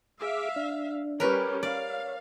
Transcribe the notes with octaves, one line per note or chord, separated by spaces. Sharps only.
G#4 E5 F5 D6
D4
G3 C#4 G4 A#4 B4 C#5
D5 F5